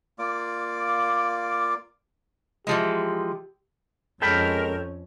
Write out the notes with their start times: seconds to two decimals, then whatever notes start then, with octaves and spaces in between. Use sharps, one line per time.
0.19 A#3 F4 D5 D6
2.67 E3 F3 G#3 G4
4.22 F2 G#3 C#4 A4 A#4 G5 B5